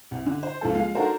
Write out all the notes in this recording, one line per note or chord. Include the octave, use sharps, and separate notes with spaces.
C2
D3
C5
C#2 F3 A4
F3 G#3 F5
D4 D#4 F#4 A4 A#4 C5